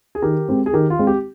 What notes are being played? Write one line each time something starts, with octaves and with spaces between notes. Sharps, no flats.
G#4
D#3 G4 A#4
G#3 C4
G#4
D#3 G4 A#4
F4
G#3 C4
G4